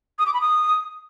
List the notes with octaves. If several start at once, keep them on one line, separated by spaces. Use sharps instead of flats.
D#6
D6
B5
D#6